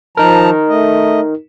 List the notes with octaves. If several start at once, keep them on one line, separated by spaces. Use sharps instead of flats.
F3 D#4 A#4 A5 A#5
A3 D#5